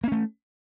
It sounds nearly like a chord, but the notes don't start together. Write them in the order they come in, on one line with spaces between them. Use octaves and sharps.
A#3 C#4 A3